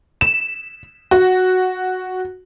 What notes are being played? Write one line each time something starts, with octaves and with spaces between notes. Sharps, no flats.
E7
F#4